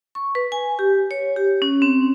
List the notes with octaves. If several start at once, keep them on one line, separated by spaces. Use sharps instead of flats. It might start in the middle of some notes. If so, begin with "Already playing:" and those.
C#6
B4
G#5
G4
C#5
G4
C#4
C4